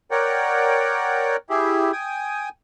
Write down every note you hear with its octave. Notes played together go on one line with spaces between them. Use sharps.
A#4 C#5 D5 F#5 G5
E4 G4 G#4
G5 G#5 D#6